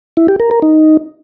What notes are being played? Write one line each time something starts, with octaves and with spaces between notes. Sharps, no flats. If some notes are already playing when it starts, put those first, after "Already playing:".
E4
G4
A#4
A#4
D#4